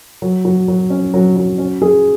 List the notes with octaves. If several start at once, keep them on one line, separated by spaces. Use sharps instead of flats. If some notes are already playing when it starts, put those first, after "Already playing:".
F#3
F#3
F#3
C#4
F#3
F#3
C#4
G#4